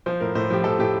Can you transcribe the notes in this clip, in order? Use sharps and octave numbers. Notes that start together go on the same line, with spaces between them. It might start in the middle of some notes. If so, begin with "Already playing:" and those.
F3 C5
A2 A#4
A2 C5
F3 G4
F3 A4
A2 G4